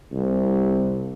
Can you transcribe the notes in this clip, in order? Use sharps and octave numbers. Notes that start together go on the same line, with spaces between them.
C2